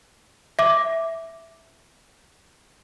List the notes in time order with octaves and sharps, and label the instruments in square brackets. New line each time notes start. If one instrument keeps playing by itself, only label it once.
[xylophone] E5 D6